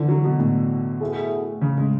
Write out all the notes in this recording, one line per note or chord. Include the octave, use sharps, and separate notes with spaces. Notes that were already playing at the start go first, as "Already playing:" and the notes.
Already playing: D3 E3
F#3
B2
A2
B2 A3 E4 G#4
C#3
G#3